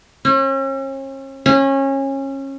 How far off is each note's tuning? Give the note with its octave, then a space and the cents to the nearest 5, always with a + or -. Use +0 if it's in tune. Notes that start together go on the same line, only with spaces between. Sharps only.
C#4 -40
C#4 -25